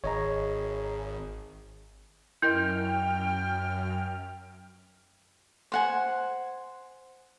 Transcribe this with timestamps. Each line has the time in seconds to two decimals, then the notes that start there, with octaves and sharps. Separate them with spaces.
0.04 G#1 G#4 C#5 D#5 A#5
2.42 F#2 E4 A#4 D#5 G5 F6 G6
5.72 C5 F#5 G#5